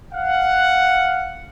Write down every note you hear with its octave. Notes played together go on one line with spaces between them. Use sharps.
F5 F#5